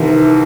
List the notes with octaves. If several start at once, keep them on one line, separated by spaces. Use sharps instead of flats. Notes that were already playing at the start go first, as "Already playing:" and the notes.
Already playing: C2 C3 D#3 E3